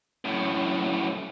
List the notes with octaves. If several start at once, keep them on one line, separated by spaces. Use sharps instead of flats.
F#2 A2